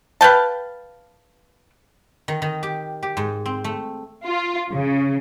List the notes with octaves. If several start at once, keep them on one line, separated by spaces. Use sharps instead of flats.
B4 F5 G5 A5
D#3
D#3
G4
G4
G#2
C4
A3
F4
C#3